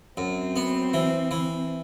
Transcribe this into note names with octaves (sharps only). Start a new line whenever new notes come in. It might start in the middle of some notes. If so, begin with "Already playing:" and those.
F#2 C4
B3
E3
E3